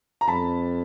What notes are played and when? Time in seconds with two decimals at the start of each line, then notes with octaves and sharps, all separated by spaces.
0.21 A#5
0.28 F2 A5 B5